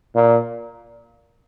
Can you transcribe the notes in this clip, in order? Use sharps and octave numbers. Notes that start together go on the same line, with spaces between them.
A#2